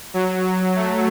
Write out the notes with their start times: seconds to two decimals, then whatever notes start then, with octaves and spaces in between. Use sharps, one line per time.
0.14 F#3
0.76 A3